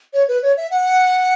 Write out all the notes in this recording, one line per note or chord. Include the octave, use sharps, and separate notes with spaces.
C#5
B4
C#5
E5
F#5